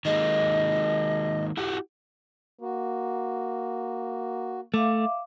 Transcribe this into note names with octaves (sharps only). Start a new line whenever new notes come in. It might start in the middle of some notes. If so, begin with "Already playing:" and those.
D#3 G#3 A#3 D#5
E4 F#4 G4
A#3 F#4
A3 E5 F5 D6